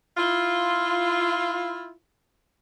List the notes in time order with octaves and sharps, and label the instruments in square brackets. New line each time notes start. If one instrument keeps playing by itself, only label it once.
[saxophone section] E4 F4